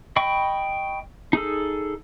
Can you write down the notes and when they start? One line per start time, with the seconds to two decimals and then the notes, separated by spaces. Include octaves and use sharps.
0.16 D#5 G5 B5 C#6
1.33 D#4 G#4 A4